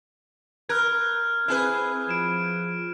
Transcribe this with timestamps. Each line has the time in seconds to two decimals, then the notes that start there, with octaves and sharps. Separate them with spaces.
0.69 A#4 F6 F#6 G#6
1.48 C4 E4 G#4 B4
2.09 F3 D7 E7